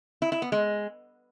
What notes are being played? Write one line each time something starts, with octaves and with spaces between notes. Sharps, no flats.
E4
E4
B3
G#3